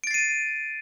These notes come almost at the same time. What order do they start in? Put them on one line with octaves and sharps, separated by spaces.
D7 A6 C7 D#7